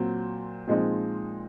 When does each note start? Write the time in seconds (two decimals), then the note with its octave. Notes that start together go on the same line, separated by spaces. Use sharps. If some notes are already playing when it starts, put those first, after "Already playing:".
Already playing: A#2 F#3 C4
0.68 A#2 F3 G#3 C4 D#4